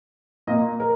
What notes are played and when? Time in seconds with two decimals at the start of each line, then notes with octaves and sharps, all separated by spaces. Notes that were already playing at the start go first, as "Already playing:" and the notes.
0.47 A#2 A#3 D#5
0.80 A#4